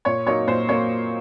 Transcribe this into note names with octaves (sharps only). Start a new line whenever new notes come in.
A#2 C#5
F#3 A#3 D#4 C#5
A#2 C5
F#3 A#3 C#5